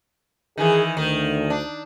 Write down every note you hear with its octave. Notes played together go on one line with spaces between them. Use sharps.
D#3 E3 G#4
D2 D#3
D4